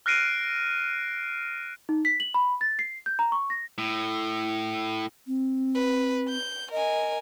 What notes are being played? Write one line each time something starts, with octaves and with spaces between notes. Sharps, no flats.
F6 F#6 A#6 C7 D7 D#7
D#4
B6
F#7
B5
A6
C7
G6
A#5
C#6
A#6
A2
C4
B4
G6
A#4 D#5 G#5